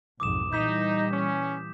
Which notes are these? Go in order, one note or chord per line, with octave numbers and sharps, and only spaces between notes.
B1 F2 G#2 D6 D#6 E7
A#2 E3 G3 D#4 G6 B6 E7
C#4